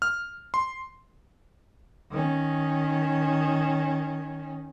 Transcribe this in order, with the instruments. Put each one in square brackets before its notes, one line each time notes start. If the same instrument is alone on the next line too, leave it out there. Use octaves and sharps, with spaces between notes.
[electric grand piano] F6
C6
[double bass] D#3 C#4